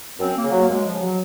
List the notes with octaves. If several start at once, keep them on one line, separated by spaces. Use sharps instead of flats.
F#2 C4
A#3
C#3
F#3
A#3
F#2 G#3
F3
C#3
F#3